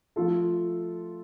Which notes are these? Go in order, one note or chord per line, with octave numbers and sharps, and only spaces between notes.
F3 A3 F4 A4